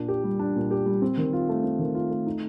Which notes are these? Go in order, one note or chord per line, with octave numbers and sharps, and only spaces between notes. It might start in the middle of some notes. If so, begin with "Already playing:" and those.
Already playing: A#2 D4
G4
G3
D4
A#2
G4
G3
C4
D#3
F4
A3
C4
D#3
F4
A3
D#4